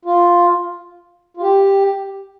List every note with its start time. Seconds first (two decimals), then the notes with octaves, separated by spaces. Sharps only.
0.05 F4
1.37 F4
1.42 G4